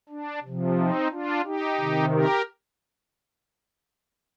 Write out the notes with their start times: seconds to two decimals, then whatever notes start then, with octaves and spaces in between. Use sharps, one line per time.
0.09 D4
0.43 C3
0.48 F3
0.77 C4 D#4
1.11 D4 F4
1.44 D#4 G4
1.78 C3 D#3
2.12 G4 A#4